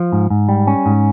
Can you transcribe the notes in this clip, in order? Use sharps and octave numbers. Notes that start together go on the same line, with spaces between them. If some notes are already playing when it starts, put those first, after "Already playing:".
Already playing: F3
G#2
G#2
G3
C#4
G#2